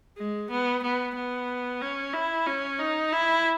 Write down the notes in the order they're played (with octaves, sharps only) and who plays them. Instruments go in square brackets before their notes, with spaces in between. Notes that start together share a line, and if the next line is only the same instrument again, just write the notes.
[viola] G#3
B3
B3
B3
C#4
E4
C#4
D#4
E4